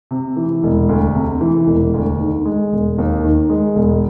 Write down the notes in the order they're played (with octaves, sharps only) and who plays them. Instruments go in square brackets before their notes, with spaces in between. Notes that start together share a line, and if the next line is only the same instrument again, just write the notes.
[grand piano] C3
E3
E1
D2
C3
E3
E1
D2
D#3
G#3
E1
D#2
D#3
G#3
E1